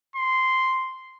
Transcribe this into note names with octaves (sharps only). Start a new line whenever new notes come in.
C6